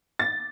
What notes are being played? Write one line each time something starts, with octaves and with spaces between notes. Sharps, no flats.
A6